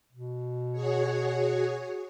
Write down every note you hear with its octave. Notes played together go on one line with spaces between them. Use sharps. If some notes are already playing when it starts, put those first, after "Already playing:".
B2
F#4 G#4 C#5